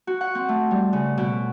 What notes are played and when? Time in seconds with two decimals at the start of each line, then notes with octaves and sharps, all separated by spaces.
0.07 F#4
0.21 F#5
0.35 C4
0.49 A3
0.71 G3
0.93 C#3
1.18 B2